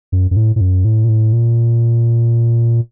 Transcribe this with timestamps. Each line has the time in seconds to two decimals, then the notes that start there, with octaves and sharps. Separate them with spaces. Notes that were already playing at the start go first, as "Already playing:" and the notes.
0.12 F#2
0.31 F#2
0.36 A2
0.56 A2
0.61 F#2
0.85 A2
1.04 A#2
1.09 A2
1.33 A#2